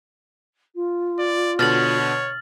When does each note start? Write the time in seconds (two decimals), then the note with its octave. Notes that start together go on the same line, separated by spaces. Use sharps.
0.75 F4
1.19 D5
1.59 B2 D3 C#5 F6 A6 F#7